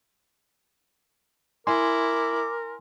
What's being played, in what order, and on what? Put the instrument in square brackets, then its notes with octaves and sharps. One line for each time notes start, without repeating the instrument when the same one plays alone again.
[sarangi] E4 [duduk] A#4 [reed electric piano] G#5 C6 [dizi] D6